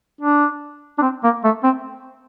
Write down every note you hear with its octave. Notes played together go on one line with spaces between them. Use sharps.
D4
D4
C4
A#3
A3
C4